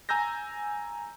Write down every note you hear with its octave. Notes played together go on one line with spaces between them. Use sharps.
G#5 A#5 E6 G6 A#6